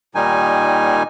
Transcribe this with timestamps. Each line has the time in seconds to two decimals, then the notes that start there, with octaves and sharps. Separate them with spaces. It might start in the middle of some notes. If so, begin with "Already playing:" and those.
0.15 A#2 D#3 G3 D#4 G#5